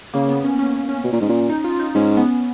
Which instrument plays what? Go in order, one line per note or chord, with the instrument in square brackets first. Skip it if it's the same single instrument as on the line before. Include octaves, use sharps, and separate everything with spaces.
[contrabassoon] C#3 [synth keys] A#3
[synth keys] B3
C#4
C#4
C#4
C#4
[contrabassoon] B2
A#2
G#2
A#2
[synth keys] D#4
F4
D#4
[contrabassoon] G#2 [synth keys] C#4
[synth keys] B3